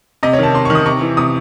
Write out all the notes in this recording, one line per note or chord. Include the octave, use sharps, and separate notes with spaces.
C3 D#5
C#5
D#3 A5
C3 C6
C#6
D#3
D#6
C3 C#6
E3
C3 D#6